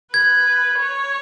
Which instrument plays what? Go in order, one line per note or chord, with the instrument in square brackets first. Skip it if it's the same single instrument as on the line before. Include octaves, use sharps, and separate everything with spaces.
[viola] B4 [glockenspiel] G#6
[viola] C#5